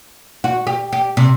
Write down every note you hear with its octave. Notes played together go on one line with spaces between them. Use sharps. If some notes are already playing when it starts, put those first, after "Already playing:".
F#4
G4
G4
C3